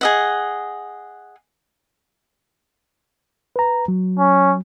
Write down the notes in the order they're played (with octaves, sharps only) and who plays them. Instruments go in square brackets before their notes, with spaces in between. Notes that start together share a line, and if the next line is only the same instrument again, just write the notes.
[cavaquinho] G#4 D#5 F#5
[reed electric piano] B4 A#5
F#3
[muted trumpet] C#4